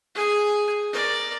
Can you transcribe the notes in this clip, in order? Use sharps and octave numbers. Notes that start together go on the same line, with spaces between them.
G#4 G#5
A#4 D5